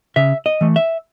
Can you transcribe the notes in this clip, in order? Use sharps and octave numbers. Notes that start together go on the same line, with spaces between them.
C#3 E5
D#5
E3 A3
E5